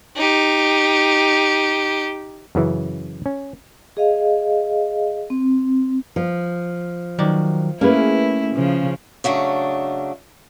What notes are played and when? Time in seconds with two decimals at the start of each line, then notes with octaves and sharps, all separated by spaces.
0.16 D#4 G4
2.55 F#2 C#3 E3
3.26 C#4
3.97 G#4 D#5 F5
5.30 C4
6.16 F3
7.19 D#3 F#3 D5
7.81 A3 A#3 C#4 E4 G#4 B4
8.55 C#3 F3
9.24 C#3 F#3 A3 D4